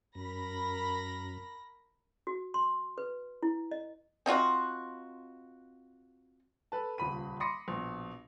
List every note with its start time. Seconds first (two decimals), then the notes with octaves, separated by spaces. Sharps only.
0.15 F#2 A#4 B5 A#6
2.27 F#4
2.54 C6
2.98 B4
3.43 E4
3.71 D#5
4.26 C4 D#4 F4 F#4
6.72 A4 B4 A5
6.98 D#1 C#2 B5 D#7
7.40 B5 C6 D6 D#6 A#6 C#7
7.68 A#1 B2